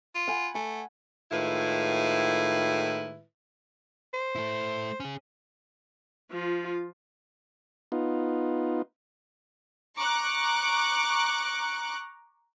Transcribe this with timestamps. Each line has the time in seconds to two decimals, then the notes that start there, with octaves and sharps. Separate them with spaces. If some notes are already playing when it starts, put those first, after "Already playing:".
0.15 F4
0.28 F#5 G#5 B5
0.55 A3 G#5
1.31 A2 D#3 G#3 E4 F4 B4
4.13 C5
4.35 A3 E4
5.00 C#4 G#4
6.31 F3 F4
7.92 B3 D#4 F4
9.97 A#5 C#6 D6 F#6